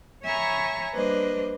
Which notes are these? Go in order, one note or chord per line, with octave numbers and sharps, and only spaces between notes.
C#5 E5 G#5 A#5 B5 C#6
G3 A#3 D4 B4 C5 D#5